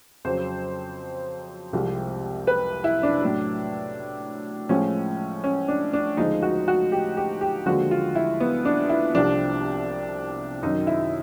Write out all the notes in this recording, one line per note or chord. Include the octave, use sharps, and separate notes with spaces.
F2 C#3 F#3 C5
C2 C3 F3 G#3
B4
E4
D4
A2 F#3
A2 F3 G#3 C#4
C#4
D4
D4
D2 C#3 F3 G#3 D#4
F#4
F#4
G4
G4
G4
D#2 D3 F3 G#3 F#4
F4
E4
B3
D4
E4
C2 C3 F3 D4
F#2 D#3 F#3 D#4
E4